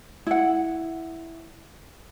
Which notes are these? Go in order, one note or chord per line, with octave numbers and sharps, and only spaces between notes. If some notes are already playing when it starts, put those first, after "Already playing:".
E4 F#5